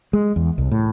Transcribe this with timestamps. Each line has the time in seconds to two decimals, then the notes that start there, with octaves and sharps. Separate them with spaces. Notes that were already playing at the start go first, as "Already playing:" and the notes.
0.13 G#3
0.36 E2
0.58 C2
0.71 A2